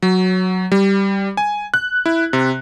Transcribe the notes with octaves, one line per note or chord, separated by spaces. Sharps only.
F#3
G3
G#5
F#6
E4
C3